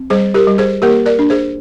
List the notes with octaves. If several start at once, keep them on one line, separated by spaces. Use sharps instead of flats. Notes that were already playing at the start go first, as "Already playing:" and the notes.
Already playing: C4
G3 G#4 C5
G4 A#4
G3
G#4 C5
A#3 G4 A#4
A#4 D5
D4
G#4 C5